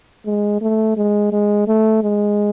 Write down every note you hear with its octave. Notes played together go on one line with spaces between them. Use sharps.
G#3
A3
G#3
G#3
A3
G#3